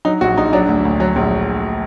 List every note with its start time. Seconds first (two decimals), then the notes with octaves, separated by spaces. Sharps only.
0.05 F#3 D#4
0.21 A#1 F#4
0.37 A#1 D#4
0.53 F#3 D4
0.69 D2
0.85 D2
1.00 F#3
1.16 A#1